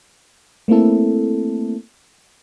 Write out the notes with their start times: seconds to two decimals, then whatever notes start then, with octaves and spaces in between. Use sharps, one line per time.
0.68 A3 A#3 C4 E4 A4